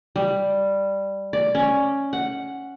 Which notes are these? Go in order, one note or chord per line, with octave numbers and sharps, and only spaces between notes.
G3
D5
C#4
F#5